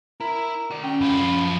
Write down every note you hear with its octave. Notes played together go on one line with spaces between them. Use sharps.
E4 A#4
F#4 D5
C#4 G5
F#2 F4 B5
F3